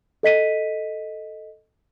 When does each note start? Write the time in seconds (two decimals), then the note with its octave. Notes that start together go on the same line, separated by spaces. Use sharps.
0.23 A4 D#5 B6 D#7